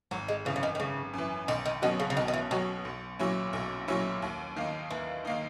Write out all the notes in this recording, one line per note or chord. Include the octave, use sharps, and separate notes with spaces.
G#1 F#3
G#3
F#2 C#3 E3
C#3
D#3
D#3
G#1 C#3
F#2 E3
B1 D#3
D#3
B2 D#3 F#3 C#4 F#4
C#3
C#3
B1 D#3
D#3
E3
B2 D#3 F#3 C#4 F#4
B1
A#2 F#3 C#4 E4
B1
A#2 F#3 C#4 E4
D#2
D#3 A#3 D#4
D#2 E3
D#3 A#3 D#4